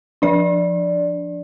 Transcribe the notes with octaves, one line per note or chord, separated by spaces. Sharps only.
F3 D4 D5